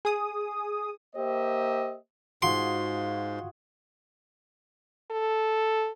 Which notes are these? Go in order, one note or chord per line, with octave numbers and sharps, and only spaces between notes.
G#4 D#6
A#3 G4 C5 D#5 E5
G#2 F4 F#4 G#4 C6
A4